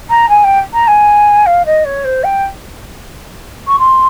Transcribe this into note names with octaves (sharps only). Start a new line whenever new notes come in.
A#5
G#5
G5
A#5
G#5
F5
D#5
C#5
C5
G5
C#6
C6